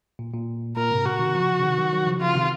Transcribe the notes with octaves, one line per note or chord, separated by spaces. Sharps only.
A#2
A#2
A#2 A#4
G#2 C3
A#2 C#3 F#4
C3 D#3
C#3 F3
C#3
C3 D#3
D#3 F#3
D#3 F#3
C#3 F3
C#3 F3 F4
C3 D#3